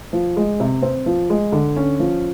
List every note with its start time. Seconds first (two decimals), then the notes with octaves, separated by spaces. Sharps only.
0.13 F3
0.37 G#3
0.60 C3
0.82 C4
1.06 F3
1.30 G#3
1.52 D3
1.76 C#4
1.99 F3